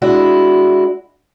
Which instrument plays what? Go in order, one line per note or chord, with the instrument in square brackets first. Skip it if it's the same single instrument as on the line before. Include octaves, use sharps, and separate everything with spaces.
[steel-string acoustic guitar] G#3 D4 E4 F#4